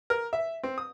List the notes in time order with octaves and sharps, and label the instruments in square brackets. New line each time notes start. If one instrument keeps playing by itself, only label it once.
[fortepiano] A#4
E5
C4
D#6